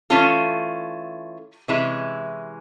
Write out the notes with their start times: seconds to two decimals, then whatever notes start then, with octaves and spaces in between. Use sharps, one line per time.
0.10 E3 A3 C#4 F4 A4
1.68 C3 E3 G#3 C#4 E4